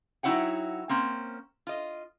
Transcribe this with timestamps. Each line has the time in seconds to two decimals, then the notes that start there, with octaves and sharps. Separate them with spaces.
0.23 F#3 D#4 E4 C#5 F#5 G5
0.89 A#3 C4 C#4
1.67 F4 D#5